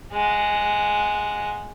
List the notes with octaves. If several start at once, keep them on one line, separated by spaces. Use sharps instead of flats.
G#3 F#5